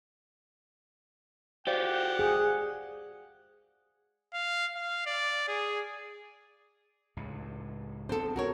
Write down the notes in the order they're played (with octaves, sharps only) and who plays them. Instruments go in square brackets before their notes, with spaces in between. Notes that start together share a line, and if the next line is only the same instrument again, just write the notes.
[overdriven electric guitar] F#4 G4 [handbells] C5 D5 F5 [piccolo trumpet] F#5
[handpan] G#4
[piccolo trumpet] F5
F5
D5
G#4
[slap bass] C#2 A2
[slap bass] B3 C4 D4 [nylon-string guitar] A4 C5
[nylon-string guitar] F#4 A#4 C#5